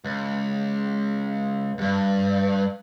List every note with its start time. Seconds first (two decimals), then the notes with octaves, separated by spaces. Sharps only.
0.04 C#2
1.78 D2 G2